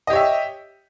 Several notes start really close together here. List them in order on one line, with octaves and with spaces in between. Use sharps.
D#5 G4 C#5 E5